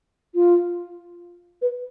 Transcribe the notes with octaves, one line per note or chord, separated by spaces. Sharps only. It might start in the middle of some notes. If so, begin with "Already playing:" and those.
F4
B4